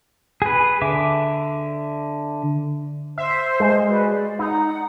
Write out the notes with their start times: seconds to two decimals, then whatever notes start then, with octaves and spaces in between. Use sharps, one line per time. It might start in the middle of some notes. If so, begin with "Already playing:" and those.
0.42 G#4 B4
0.82 D3 E5 D6
3.18 C5 E5
3.60 G#3
3.88 F#4 B4 D5
4.08 D5
4.39 D#4 F#5